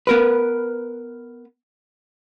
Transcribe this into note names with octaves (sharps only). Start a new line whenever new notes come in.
B3 A#4 B4